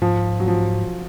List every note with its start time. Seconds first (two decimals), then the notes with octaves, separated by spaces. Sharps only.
0.01 G#2 F3
0.40 F#3
0.48 F3